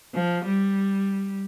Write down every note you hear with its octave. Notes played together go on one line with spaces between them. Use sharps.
F3
G3